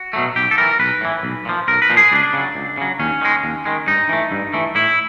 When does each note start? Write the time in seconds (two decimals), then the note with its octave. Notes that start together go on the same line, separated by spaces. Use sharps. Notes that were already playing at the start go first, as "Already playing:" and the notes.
Already playing: F#4
0.13 B2 F#3 A3
0.36 B1 G4
0.51 A4
0.57 A2 E3 A#4
0.79 B1 B4
1.01 A2 E3
1.23 B1
1.45 A#2 F3
1.68 B1 A#4
1.82 B4
1.90 A#2 F3
1.97 G#4
2.12 C#2 D4
2.33 C#3 F#3
2.55 C#2
2.77 C#3 F#3
2.99 D#2 C#4
3.21 D#3 G#3
3.44 D#2
3.66 D#3 G#3
3.87 G2 D#4
4.09 E3 A3
4.31 G2
4.54 E3 A3
4.75 A2 E4